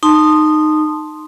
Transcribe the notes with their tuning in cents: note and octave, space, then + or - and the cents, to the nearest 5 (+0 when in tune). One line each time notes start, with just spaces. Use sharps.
D#4 -15 A5 +0 C6 +0